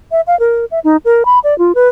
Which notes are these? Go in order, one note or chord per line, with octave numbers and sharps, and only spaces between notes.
E5
F5
A#4
E5
D#4
A#4
B5
D5
F4
B4